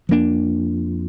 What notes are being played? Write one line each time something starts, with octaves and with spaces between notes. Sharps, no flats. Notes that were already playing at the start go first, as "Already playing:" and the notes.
F2 F3 A#3 D4